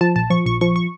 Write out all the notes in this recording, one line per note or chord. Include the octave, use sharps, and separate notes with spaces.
F3 A5
A#1 A5
F3 C#6
A#1 C#6
F3 C#6
C#6